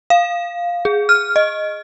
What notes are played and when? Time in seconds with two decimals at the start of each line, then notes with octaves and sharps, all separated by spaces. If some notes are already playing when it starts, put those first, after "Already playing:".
0.10 F5
0.85 G#4
1.09 F6
1.36 D#5